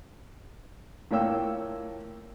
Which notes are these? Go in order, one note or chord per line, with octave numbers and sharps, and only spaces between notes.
A2 A#3 F4 C#5 G5 E6